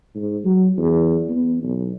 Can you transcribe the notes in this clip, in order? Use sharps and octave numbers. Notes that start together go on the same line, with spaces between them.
G#2
F#3
E2
B3
B1